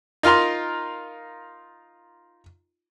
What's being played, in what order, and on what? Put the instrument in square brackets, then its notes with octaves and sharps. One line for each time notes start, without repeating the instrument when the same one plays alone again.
[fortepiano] D#4 F4 A#4 A#5 C6